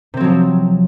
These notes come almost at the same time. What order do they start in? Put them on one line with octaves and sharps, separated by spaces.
C3 C4 F#3 F3